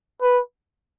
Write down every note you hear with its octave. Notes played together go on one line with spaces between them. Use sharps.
B4